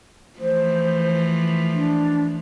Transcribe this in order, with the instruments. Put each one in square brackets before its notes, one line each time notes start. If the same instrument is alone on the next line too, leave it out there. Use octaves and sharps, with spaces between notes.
[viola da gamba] E3 F3 A3 [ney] C5
[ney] D4